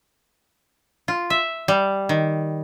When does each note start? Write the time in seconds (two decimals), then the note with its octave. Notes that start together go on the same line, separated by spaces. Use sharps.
1.08 F4
1.30 E5
1.68 G3
2.09 D#3